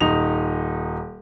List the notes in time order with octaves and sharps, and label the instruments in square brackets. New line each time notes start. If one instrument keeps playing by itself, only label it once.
[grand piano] D#1 D#4 F7